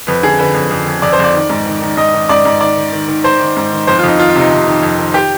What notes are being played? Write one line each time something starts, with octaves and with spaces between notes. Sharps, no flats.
F2 B4
D3 G#4
D3 B4
F2
F2
F2
F2 D5
C5
F2 D5
D#3
G#2
D#3
D#3
G#2 D#5
D#3
G#2 D5
G#2
D#3 D5
D#3
D#3
D#3
D#3 C5
D#3
G#2
D#3
F2 C5
F4
F2 D#4
D#3 F4
F4
C3 D#4
C3
D#3
F2
D#3
G4